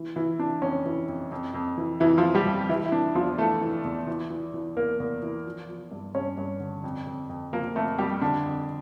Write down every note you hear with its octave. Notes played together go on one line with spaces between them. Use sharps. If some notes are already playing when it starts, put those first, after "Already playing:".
Already playing: E3
E3 E4
E3 D4
F2 C#4
E3
F2
F2
F2
E3
F2 E3 E4
F3 F4
E3
G3 G4
F2
E3 E4
E4
E3 D4
E2 F3 F4
E3 A3 A4
E3
E2
E3
E3
E3
E2 A#3 A#4
E2
E3
F3
F3
G2
G2 C#4 C#5
G2
D3
F2
F2
F2
F3 A#3 A#4
F2 A3 A4
F2 G3 G4
D3 D4
F2